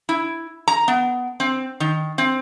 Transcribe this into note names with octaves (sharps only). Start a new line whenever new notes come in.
E4
A#5
B3
C4
D#3
C4